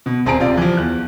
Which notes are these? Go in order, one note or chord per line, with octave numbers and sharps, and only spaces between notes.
B2
D#1 C4 G#4 A5 A#5 D7
C3 F4 D5
E3 F3
E2 F#6